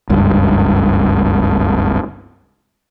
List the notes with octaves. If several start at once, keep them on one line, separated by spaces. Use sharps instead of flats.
F#1 C#2 G2